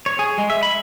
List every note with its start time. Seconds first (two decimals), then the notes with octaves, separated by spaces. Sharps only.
0.06 C#5
0.19 G#4
0.38 G#3
0.50 E5
0.63 B5